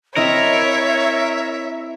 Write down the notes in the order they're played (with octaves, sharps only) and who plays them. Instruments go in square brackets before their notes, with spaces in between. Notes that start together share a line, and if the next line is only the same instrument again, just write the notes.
[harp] C4 E4 D#5 [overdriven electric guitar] A#4 [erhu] C#5 [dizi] E5